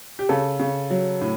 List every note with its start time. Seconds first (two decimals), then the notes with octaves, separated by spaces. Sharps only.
0.19 G4
0.29 C#3 A4
0.60 C#3
0.90 F#3
1.21 A2